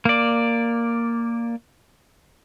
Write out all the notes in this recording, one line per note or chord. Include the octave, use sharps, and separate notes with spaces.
A#3 D5